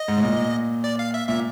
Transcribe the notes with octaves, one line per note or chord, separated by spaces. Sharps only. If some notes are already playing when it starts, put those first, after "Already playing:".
Already playing: D#5
G#2
A2
A#2
D5
F5
E5
A#2 E5